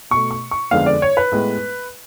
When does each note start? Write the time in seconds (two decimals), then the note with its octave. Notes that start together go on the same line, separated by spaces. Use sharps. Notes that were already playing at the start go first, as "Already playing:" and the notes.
0.11 B2 A3 C#6
0.31 C#6
0.51 C#6
0.71 F2 D3 G#3 B3 F5
0.86 D5
1.02 C#5
1.17 B4
1.32 A2 G#3 B3